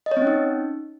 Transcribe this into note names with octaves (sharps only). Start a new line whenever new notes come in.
D#5
C#5
C4
C#4
D#4